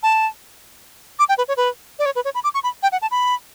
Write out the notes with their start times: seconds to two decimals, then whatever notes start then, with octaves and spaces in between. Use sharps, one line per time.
0.03 A5
1.19 D6
1.29 G5
1.38 B4
1.48 C#5
1.57 B4
1.99 D5
2.06 C#5
2.16 B4
2.25 C#5
2.35 B5
2.44 D6
2.54 C#6
2.63 B5
2.83 G5
2.92 F#5
3.02 A5
3.11 B5